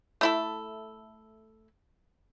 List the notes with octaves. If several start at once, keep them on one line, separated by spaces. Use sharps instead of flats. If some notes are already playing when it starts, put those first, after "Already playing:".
A3 E4 A4